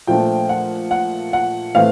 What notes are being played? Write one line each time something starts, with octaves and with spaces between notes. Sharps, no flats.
A#2 F3 A3 D4 G5
F#5
F#5
F#5
A2 E3 A3 C4 F5